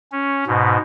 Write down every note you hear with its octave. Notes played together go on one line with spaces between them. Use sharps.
C#4
G#2 B2